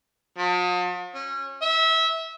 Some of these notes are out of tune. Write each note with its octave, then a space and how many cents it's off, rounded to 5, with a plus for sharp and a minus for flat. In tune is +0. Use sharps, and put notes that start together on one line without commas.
F3 +45
C#4 -25
E5 -25